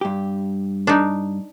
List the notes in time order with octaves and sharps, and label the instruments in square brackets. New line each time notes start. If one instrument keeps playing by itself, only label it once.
[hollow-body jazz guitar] G2 G4
[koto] D4 D#4